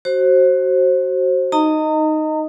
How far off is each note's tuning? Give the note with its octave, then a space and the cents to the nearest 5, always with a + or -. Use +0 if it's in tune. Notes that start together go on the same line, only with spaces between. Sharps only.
F#4 +20 C5 +25
D#4 +0 D#5 +0 A#5 -35